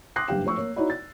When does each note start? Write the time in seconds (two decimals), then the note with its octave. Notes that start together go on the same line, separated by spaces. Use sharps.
0.16 C6 D6 D#6 F#6 A#6 C7
0.28 F#1 G2 G4 F5 G5 E7
0.44 F3 A3 C5 C#6 E6
0.56 A#3 C#5
0.76 D#4 E4 F#4 C#5 D5 B5
0.90 A6